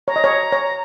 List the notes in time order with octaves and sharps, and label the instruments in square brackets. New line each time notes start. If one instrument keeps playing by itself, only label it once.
[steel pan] C#5 [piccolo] A#5
[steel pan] D#5
C#5
C#5